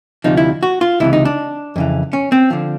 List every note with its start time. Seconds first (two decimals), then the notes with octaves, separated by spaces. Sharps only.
0.24 D2 C3 F3 D#4
0.37 E4
0.63 F#4
0.81 F4
1.00 C#2 C3 E3 E4
1.13 D#4
1.25 D4
1.76 F2 C#3 E3
2.13 C#4
2.32 C4
2.50 D3 F3